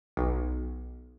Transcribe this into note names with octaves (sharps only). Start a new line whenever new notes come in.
B1